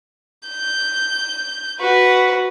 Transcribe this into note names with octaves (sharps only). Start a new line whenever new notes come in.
G6
F#4 B4